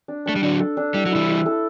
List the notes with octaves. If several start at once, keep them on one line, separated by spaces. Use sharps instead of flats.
D4
A3 D4
G3
D3 F#3 D4
A4
D4
G3 E4
F#3
E3 G3 E4
E4
A4